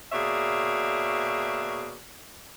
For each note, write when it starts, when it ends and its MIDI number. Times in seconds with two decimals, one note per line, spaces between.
0.13 1.96 47
0.13 1.96 58
0.13 1.96 68
0.13 1.96 73
0.13 1.96 74
0.13 1.96 76